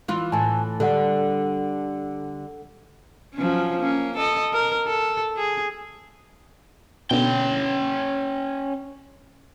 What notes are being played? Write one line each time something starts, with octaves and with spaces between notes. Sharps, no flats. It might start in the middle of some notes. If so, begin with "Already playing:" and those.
E3 F4
A2 E3 G#5 A5
D3 G3 A4 F#5
F3 F#3 C#4
A#3 C#4
A4 D#5
A#4
A4
G#4
B2 D3 C#4 G5